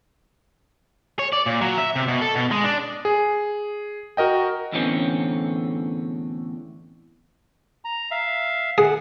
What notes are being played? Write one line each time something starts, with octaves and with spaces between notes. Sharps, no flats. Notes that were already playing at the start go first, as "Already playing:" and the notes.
C#5
D5
A#2
F#3
E5
C3
B2
A4
B2
G#3
D4
G#4
F#4 A#4 D#5 G5
E2 A2 D3 E3 C4 C#4
A#5
E5 F5
G#4 F#5